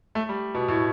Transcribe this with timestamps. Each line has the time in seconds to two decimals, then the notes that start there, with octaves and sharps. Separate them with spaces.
0.15 A3
0.29 G3
0.54 B2
0.68 A2